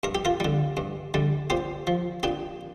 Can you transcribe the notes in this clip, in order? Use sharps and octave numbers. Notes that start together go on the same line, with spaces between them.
G2 A#4
G4
F4 A#4
D3 G3
G2
D3 G3
A#2 G4 C5
F3
A#2 D4 G4